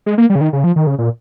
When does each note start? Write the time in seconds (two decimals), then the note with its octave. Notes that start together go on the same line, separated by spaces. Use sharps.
0.06 G#3
0.18 A#3
0.30 G3
0.35 C#3
0.41 D#3
0.53 C#3
0.64 F3
0.76 D#3
0.87 C#3
0.98 A#2